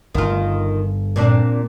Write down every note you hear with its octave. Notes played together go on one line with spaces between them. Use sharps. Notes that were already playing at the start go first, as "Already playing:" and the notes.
G1 D#3 F4
A#2 C4 D4